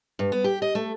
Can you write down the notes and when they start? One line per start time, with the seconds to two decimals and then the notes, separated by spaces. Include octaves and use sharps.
0.19 G2
0.32 B3
0.44 G4
0.62 D#5
0.75 A3